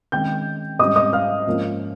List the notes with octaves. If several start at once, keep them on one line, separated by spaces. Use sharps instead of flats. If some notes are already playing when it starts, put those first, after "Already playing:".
D#3 G#3 C#4 G5 G6
G#2 G3 C#4 D#5 D#6
D#5 D#6
F5 F6
G#2 F3 A#3 C#4